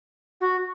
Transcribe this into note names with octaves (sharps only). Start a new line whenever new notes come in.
F#4